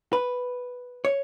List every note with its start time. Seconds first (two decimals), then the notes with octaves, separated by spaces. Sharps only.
0.13 B4
1.05 C#5